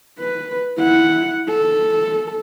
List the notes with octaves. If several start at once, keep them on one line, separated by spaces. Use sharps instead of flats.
B4
E4 F#5
A4